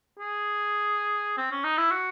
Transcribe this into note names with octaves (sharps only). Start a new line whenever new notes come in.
G#4
C4
C#4
D#4
E4
F#4